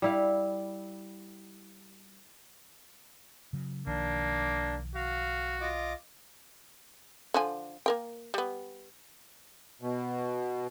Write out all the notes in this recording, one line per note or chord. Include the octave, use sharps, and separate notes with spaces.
G3 E4 F5
C#3 F#3
B1 D#3 F3 A#3 D4
F#4 F5
F4 D#5 D6
D3 F3 G#5
A#3 A#4 G5
G3 B3
B2